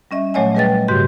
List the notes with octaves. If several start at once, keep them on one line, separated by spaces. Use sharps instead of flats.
G3 C#4 D#5 E5
A#2 F#3 A3 C#5 D#5 G#5
G3 G#4 B4 D#5 G5 A6
G#2 C#3 F#4 G4 G6